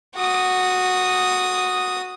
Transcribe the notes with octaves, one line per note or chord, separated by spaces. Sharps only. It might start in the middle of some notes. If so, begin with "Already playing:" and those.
F#4 D#6